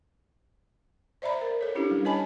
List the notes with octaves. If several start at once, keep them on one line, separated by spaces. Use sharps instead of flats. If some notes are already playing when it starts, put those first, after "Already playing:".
C5 D5 E5 A#5 B5
A#4
A4 C#5
C#4 D4 E4 G4
G3
B4 C#5 D#5 G#5 A5 B5